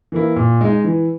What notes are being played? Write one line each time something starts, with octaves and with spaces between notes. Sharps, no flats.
E3 A#3 E4
A#2
G#3 D#4
E3